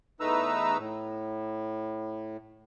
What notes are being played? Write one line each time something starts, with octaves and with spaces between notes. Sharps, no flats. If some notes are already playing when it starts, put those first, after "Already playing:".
E2 A3 D#4 B4 A#5 E6
A2